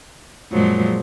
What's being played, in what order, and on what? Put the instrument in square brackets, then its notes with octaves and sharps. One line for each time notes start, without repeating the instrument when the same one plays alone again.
[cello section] F#2 G#3 [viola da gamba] A#2 F3 F#3